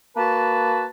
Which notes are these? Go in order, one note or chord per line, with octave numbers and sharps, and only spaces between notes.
A#3 F#4 B4 A5